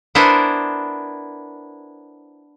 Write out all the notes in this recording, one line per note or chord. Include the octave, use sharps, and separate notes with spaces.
B3 D4 E4 A#4 C5 G#5